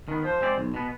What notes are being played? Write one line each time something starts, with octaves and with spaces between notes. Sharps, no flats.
D#3 B3
F3 C5
G#3 C4 G4 D5
B1
B2 B3